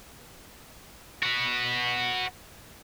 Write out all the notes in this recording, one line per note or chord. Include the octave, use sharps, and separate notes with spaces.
F#4 B4